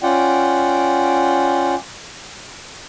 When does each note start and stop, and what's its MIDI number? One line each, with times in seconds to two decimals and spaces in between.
0.03 1.75 61
0.03 1.75 65
0.03 1.75 74
0.03 1.75 78
0.03 1.75 79